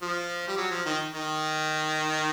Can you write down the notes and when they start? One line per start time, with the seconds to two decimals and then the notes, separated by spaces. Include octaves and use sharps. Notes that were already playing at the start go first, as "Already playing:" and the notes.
0.02 F3
0.48 G3
0.57 F#3
0.71 F3
0.85 D#3
1.13 D#3